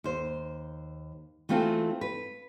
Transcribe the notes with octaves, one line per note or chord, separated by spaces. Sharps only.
D#2 C5
E3 A3 C4 F4 F#4 A4
B4